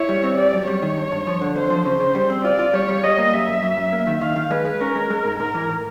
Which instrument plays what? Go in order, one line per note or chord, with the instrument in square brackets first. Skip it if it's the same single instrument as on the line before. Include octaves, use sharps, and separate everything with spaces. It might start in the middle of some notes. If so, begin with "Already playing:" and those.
Already playing: [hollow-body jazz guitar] E4 [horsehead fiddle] C#5
[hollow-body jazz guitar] G3
C4
[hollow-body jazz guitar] G3 [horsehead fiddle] D5
[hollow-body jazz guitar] F#2
[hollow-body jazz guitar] G3 [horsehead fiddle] C#5
[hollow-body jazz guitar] D#3
G2
G2
F3
D3
[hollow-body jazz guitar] F2 [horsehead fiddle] C5
[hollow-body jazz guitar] F3
[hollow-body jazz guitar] C#3 [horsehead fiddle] C5
[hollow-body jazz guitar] C#3
G3
C4
[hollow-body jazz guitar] F4 [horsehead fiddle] D5
[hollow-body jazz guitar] F4
[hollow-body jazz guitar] G3 [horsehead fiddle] C#5
[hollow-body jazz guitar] G3
[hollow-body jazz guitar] G3 [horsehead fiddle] D#5
[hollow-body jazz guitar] A#3
[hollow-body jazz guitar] F#2 [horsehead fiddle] E5
[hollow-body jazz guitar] F#2
F#2
F#2
A#3
D#3
[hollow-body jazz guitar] D#3 [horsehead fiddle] F5
[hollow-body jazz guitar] D#3
[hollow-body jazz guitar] G#3 [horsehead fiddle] B4
[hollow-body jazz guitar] G#3
[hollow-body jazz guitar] C#4 [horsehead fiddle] A#4
[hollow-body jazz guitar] G#3
G#3
G#2
[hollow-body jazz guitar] G#2 [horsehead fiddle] A#4
[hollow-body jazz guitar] E3
A2